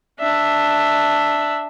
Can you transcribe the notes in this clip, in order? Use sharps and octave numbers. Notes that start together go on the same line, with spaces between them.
D4 E5